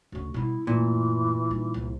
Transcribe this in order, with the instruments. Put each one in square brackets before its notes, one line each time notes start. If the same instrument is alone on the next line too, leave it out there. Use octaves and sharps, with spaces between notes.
[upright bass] D2 C#3 [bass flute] F#4
[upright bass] B2 G3 [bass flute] E4
[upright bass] F#2 A3 [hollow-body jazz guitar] A#2 [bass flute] E3
[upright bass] G3 D#4
C2